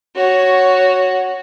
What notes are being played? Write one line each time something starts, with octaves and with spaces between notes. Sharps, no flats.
F#4 C#5